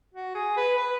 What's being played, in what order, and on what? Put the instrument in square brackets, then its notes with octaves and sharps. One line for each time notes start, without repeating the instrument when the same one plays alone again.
[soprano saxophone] F#4
G#4
B4
B4